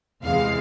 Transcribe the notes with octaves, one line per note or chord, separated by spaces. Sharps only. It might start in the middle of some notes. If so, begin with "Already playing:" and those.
E2 C3 E3 G#3 F5